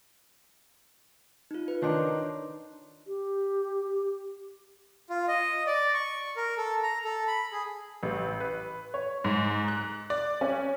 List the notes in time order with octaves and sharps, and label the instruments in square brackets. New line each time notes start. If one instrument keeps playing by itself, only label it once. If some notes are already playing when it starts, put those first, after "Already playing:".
[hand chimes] D#4 F4
B4
[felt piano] D#3 D4 D#4 [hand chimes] C#5 C6
[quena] G4
[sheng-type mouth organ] F4
D#5
D5
C#6
A#4
A4
A#5
A4
B5
G#4
[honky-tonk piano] A1
B4
C#5
G#2
F#6
D5
C#4